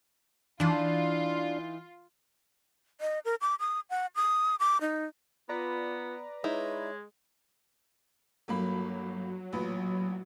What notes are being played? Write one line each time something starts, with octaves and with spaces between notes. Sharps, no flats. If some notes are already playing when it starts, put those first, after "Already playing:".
E3 D4 D#4 F4
D#5
A#4
D6
D#6
F#5
D#6
D6
D#4
B3 F4 B4 D5 A#5
G#3 D#4 E4 C#5
G1 F#3 A#3 B5
A1 A#2 B4